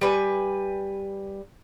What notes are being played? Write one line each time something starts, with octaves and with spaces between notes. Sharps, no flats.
G3 B4 G#5